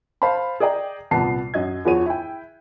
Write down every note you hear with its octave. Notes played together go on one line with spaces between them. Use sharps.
C5 F5 A5 B5
G#4 D5 D#5 G5 A#5
C2 A#2 B3 A5 C7
F#2 F#3 D#5 G#6
E2 F3 F#4 G#4 C#5 D#7
E4 G5